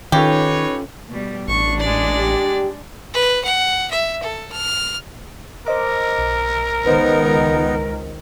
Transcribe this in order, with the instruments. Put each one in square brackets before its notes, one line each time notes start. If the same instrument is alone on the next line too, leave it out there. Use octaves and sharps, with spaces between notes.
[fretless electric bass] D#3 [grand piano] C#4 F4 A4 [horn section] D#4 B4 C#5 [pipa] G4
[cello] B2 G3
[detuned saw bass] A1 [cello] D4 [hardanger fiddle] C#6
[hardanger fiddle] G#3 D5
[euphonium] G4
[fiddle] B4
F#5
E5
A4
F6
[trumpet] A#4 [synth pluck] C5 D#5 D6
[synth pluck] B1
[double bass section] C#2 D#3 [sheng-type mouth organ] B3 D#4 [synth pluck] B4 C5